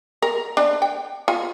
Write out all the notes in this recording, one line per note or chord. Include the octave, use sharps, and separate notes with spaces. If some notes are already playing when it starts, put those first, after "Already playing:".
A#4
D4
G5
F4